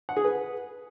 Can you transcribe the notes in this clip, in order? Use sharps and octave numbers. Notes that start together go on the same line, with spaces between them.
F#5
G#4
B4